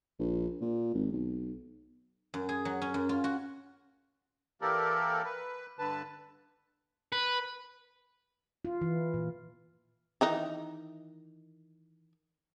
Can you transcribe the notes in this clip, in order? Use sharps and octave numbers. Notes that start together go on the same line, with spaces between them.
A#1
A#2
G#1
B1
F#2
G#4
F#3
C#4
F#2
F4
F#4
E3 A#3 G4 A4 A#4 D5
B4
G2 D3 B4 A5
B4
F4
E3
A#2
D#3 E3 D#4